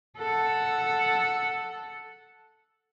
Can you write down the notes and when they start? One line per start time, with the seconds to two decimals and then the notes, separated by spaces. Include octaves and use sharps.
0.18 A4 F#5